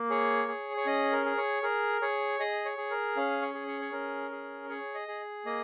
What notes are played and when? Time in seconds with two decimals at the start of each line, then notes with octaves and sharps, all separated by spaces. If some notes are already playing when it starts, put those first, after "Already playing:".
Already playing: A#3
0.10 G#4 C#5
0.48 G#4
0.77 C#5
0.86 C#4 D#5
1.12 A#4
1.26 G#4
1.38 C#5
1.63 G#4 A#4
2.01 G#4 C#5
2.39 G#4 D#5
2.65 C#5
2.77 G#4
2.91 A#4
3.17 C#4 F5
3.42 C#5
3.54 G#4
3.67 C#5
3.81 C#5
3.92 C#4 A#4
4.31 G#4
4.69 G#4 C#5
4.95 D#5
5.08 G#4
5.45 A#3 D#5